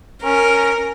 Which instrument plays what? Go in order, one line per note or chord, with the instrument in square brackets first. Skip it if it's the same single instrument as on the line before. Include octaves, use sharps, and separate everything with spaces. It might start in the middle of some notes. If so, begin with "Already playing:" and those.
[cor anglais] C#4 [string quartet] A#4